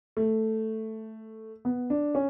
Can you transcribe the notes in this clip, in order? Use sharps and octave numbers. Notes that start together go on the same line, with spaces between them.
A3
B3
D4
C#4